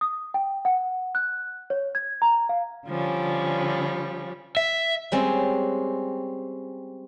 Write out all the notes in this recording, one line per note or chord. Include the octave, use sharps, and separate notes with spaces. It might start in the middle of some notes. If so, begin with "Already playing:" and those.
D#6
G5
F#5
F#6
C#5
G#6
A#5
F5
D3 F3 G3 C#4
E5
G3 G#3 C4 C#4